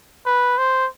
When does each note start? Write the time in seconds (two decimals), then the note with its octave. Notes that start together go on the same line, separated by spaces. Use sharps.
0.26 B4
0.58 C5